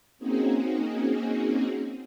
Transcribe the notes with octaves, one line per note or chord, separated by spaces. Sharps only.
A#3 C4 C#4 D#4 F#4 G#4